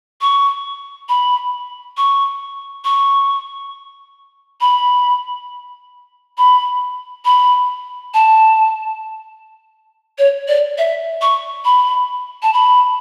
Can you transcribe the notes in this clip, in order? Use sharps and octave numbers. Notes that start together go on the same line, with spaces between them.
C#6
B5
C#6
C#6
B5
B5
B5
A5
C#5
D5
E5
C#6
B5
A5
B5